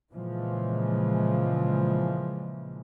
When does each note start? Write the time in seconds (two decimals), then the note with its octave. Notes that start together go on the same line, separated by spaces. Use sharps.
0.12 A#2 C#3 E3 F3 G#3